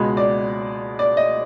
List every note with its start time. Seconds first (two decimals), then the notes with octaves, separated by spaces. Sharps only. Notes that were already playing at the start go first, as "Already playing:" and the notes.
Already playing: C#2 B2 G#3
0.17 D5
0.99 D5
1.17 D#5